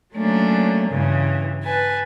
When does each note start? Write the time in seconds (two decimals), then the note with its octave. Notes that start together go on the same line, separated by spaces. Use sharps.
0.15 F#3 A3 A#3 C#4 D4
0.90 G2 C#3 E3
1.63 B4 G#5 A5